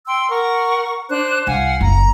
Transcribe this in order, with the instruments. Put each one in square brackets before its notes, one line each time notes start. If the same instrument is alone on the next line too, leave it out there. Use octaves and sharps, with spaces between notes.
[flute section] G5 C6 E6
A#4 F#5 C#6
D4 C5 F#6
[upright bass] C2 [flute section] F5 F#5 G#5
[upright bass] F#1 [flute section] A#5